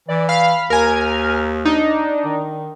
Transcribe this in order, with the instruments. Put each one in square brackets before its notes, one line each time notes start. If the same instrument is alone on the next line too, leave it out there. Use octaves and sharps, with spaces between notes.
[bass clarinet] E3 [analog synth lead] D5
[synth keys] F5 [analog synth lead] B5
[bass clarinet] D#2 [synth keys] A#4 G#5 [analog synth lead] F6
[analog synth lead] D4 [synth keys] D#4
[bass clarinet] D#3